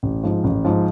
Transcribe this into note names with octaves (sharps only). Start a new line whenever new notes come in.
A1
G#2 F3
A1
G#2 F3